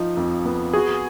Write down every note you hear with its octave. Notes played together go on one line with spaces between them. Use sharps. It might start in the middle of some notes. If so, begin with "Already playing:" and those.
Already playing: F3 D#4
F2
B3
F#4 G#4